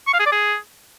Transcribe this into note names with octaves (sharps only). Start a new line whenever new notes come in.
C#6
F5
G#4
D5
G#4